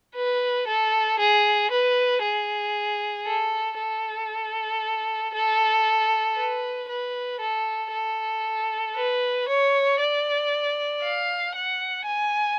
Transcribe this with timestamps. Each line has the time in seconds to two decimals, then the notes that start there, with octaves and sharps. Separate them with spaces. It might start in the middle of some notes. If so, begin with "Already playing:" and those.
0.15 B4
0.67 A4
1.19 G#4
1.71 B4
2.23 G#4
3.26 A4
3.79 A4
5.34 A4
6.37 B4
6.89 B4
7.41 A4
7.92 A4
8.96 B4
9.48 C#5
10.00 D5
11.03 F5
11.56 F#5
12.07 G#5